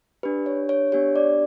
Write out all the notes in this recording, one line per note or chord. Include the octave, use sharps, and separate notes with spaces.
D4 G4 B4
C#5
C#5
B3 D4 G4 C#5
D5